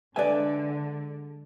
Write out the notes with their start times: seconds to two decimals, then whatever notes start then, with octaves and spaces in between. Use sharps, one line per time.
0.16 D3 G#3 B4 D5 E5 G#5